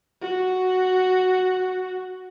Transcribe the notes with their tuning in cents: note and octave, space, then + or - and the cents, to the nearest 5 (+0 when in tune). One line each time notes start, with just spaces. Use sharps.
F#4 +0